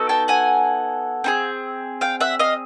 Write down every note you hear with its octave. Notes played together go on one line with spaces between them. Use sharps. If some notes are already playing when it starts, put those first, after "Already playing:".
Already playing: B3 D#4 F#4 A4
G5 A5
F#5 G#5
C4 D#4 G#4
F5 G5
E5 F#5
D#5 F5